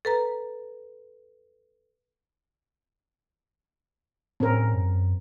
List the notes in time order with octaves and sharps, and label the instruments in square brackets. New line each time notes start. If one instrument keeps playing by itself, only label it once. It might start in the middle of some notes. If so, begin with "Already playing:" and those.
[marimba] A4 B4 A#5
[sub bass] A2 [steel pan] C4 C#4 A#4
[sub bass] F#2